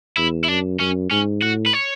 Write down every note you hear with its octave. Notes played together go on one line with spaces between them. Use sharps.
E2 E4
E4
F#2 D4
F#2 C#4
G#2 C#4
A2 F#4
B4
C#5